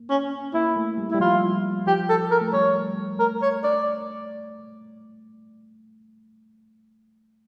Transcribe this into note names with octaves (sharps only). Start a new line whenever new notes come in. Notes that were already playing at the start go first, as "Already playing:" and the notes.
Already playing: A#3
C#4
A#3 E4
A3
G3
G3 E4
F3 F4
F3 G4
A4
A#4
A3
G3 C#5
A3 A#4
C#5
D5